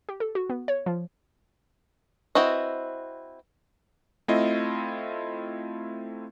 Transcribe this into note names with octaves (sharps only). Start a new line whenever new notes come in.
G4
A4
F#4
B3
C#5
F3
C4 E4 F#4 B4 D#5
A3 C4 E4 F4 D#5